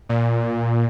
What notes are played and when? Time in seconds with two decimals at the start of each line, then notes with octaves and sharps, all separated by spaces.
0.09 A#2